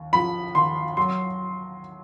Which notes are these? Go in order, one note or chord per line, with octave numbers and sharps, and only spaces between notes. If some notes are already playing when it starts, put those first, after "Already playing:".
Already playing: D#2
F3 B5
D#2 C6
F#3 C6